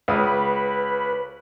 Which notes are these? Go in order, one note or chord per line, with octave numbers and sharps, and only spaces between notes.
C#2 B4 D#6